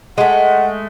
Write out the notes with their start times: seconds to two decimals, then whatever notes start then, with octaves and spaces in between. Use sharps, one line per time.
0.18 G#3 A3 F#5